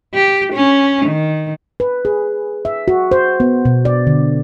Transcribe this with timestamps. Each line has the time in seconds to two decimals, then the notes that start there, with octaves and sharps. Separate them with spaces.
0.14 G4
0.53 C#4
1.06 D#3
1.80 B4
2.05 G#4
2.65 E5
2.88 F#4
3.12 C5
3.40 B3
3.65 B2
3.85 D5
4.07 D3